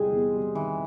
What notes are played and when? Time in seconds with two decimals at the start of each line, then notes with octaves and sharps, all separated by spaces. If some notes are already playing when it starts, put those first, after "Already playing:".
Already playing: E2 C3 G3 G#3 C4 G#4 C5
0.11 E2
0.33 G3
0.55 D#3 E3 E4